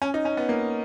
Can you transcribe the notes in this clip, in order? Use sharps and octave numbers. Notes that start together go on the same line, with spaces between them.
C#4
D#4
C#4
B3
A#3